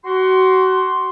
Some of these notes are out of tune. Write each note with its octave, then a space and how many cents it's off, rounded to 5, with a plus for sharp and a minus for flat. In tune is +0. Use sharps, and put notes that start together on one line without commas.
F#4 +25 C6 +0